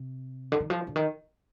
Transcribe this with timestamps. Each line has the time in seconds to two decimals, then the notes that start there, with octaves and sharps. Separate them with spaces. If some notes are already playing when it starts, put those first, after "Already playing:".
Already playing: C3
0.52 D3
0.60 D#3
0.70 F3
0.87 D3
0.96 D#3